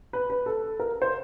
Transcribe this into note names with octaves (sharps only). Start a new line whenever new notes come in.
B4
B4
A4
A#4
C5